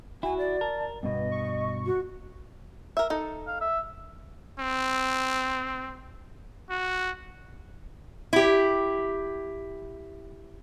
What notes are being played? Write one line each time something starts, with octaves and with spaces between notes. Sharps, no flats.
E4 F#4 G#5
D5
A#4 A5
G2 B2 B3 D#5
C#6
F#4
A#4 E5
D#4 A4
F5
E5
C4
F#4
E4 G4